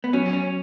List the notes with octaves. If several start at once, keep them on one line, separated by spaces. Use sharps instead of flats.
B3
F#3 C#4
C#4